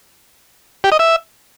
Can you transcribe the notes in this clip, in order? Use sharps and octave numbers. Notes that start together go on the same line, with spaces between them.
G4
D#5
E5